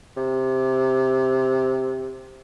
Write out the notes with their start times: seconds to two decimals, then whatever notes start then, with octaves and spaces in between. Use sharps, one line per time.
0.17 C3